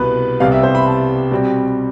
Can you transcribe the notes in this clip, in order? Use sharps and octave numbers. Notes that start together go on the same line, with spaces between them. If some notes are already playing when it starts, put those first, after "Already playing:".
Already playing: C2 B2 B3 B4
C2 C3 G3 B3 F5
E5
C5
B5
A5
B2 G3 C4